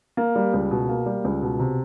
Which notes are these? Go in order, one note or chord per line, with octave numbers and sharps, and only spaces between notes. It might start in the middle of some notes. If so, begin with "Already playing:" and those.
A#3
G3
C#2
B2
A#3
G3
C#2
B2
C3